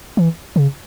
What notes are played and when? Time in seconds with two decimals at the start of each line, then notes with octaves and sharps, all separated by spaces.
0.17 E3
0.56 C#3